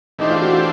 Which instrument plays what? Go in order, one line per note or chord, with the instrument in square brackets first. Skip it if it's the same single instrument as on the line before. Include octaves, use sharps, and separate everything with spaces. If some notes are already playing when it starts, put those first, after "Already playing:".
[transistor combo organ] E3 A3 D4 G4 C5 [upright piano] D#4
[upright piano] F4
F#4
F4